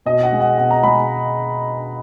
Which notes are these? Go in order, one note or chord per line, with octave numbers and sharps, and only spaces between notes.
B2 D#5
F#5
G#3
F#5
B2 F#5
A#5
G#3 B5